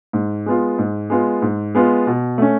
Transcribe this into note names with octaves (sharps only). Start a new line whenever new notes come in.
G#2
G#3 B3 F4
G#2
G#3 B3 F4
G#2
G#3 B3 F4
B2
A3 C#4